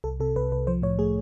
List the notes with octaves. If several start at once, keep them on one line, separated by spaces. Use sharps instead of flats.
C2 A4
C3 A4
C2 B4
C2 B4
F3 C5
A2 C#5
A3 G#4